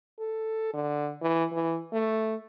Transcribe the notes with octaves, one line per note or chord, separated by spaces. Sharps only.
A4
D3
E3
E3
A3